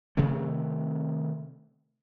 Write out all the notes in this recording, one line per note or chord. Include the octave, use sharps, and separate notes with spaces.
C3 D#3 A3 C4